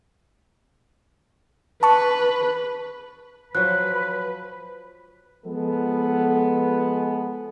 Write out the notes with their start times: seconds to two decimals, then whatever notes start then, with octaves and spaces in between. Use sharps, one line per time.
1.83 B4 A5 C#6
3.55 F3 F#3 B4 F#6
5.45 F3 G#3 B3 A4